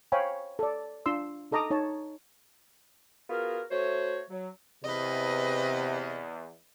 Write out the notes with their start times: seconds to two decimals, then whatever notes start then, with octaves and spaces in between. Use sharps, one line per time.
0.12 C5 C#5 F5 G5 G#5 B5
0.59 A4 D5
1.06 D4 F4 C6 E6
1.52 D#4 A4 D#5 A#5 D6 D#6
1.70 D#4 C#5 A5
3.30 B3 F4 F#4 G#4 A#4
3.71 A3 F#4 C5 C#5
4.30 F#3
4.84 E2 C3 B4 D#5